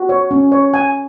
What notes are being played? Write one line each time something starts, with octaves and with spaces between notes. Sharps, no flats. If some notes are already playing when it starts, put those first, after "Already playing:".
Already playing: F#4
C#5
C#4
C#5
G#5